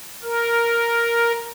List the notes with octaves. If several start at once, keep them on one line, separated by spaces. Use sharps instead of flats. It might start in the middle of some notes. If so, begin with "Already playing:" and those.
A#4